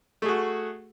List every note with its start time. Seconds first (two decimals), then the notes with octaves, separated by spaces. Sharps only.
0.22 A3
0.25 G#4
0.28 F#4